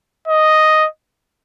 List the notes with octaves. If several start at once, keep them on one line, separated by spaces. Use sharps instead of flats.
D#5